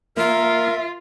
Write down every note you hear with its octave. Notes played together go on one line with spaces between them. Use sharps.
A#3 F4 A#4 E5